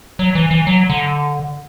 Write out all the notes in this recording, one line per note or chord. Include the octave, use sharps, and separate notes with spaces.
F#3
E3
E3
F#3
D3